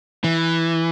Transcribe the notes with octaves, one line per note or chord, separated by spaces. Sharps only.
E3